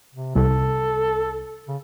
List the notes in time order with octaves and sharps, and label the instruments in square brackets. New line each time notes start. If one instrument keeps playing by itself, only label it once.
[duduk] C3
[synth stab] C2 [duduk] A4
[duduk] C#3